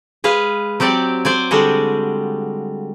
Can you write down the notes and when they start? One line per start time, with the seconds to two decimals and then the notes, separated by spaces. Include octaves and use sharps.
0.24 G#3 G#4 B4 F5
0.80 F#3 C4 G4 D5 F#5
1.25 C5 D5 G#5
1.51 D3 G3 G#3 F#4 G#4